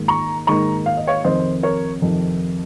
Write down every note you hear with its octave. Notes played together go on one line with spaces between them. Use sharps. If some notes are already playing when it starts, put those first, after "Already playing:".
Already playing: G#2 D#3 A#3
A#5 C#6
G#2 D#3 A#3 D#4 A#5 C#6
F5
D#5
C#5 F5
F2 C3 D#3 C5 D#5
A#4 C#5
F2 C3 D#3